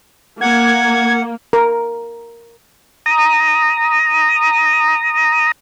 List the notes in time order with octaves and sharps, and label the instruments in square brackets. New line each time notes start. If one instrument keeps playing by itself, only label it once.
[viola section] A#3 [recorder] F#5 [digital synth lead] G#6
[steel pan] A#4
[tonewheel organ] A#5 D#6